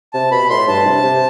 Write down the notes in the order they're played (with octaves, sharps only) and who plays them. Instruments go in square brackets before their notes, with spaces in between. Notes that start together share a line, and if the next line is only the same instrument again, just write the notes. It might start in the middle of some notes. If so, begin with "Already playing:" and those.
[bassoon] C3 [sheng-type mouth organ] A5
[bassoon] B2 [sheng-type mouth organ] B5
[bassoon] A2 [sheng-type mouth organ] C6
[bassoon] G2 [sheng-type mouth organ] A5
[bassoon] C3
C3